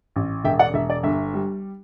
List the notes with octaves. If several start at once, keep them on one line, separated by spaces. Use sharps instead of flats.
A1
E1 E5 G5
D5 F#5
E1 E5
D5
G1 E5
G3